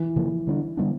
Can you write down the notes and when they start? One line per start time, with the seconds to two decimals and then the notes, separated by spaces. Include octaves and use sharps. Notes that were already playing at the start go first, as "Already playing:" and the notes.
Already playing: E3
0.16 C#3 F3 A#3
0.47 D3 G3 B3 D4
0.77 D3 G3 B3 D4